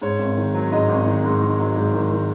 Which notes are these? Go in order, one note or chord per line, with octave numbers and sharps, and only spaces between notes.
G#2 C#5
G#1
D#3
F#3
G#2 D#5
G#1
D#3
G#2
D#3
F#3
G#2
D#3
D#3